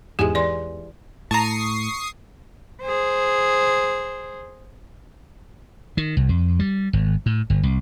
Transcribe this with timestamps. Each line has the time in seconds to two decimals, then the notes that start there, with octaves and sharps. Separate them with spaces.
0.19 E2 G#2 G#3 G4 G#5
0.35 E3 D5 C6
1.31 A2 A5 A#5 C#6 D#6 C7
2.82 G#4 C5
5.97 D#3
6.17 C2
6.29 F2
6.59 G3
6.93 G#1
7.26 A2
7.50 G1
7.63 C2